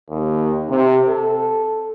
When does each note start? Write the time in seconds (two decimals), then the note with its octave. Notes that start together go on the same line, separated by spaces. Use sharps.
0.10 D#2
0.71 C3
1.09 A4